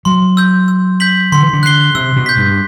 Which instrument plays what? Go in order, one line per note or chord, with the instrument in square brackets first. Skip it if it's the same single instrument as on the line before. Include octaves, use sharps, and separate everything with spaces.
[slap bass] F#3 [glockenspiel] C6
[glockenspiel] E6 G6
E6
G6 B6 F#7
[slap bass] D3 [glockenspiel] C6
[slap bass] E3
D3
[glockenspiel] F#6 C7 G7
[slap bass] C3 [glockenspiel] E6
[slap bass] B2
[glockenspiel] G6 B6
[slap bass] G2